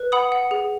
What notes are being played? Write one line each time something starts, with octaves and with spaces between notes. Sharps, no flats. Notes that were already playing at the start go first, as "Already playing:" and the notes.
Already playing: B4
F#5 B5 D#6
F#5
G#4